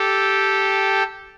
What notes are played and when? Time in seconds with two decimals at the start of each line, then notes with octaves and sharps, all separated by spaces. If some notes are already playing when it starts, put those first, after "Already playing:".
Already playing: G4 A4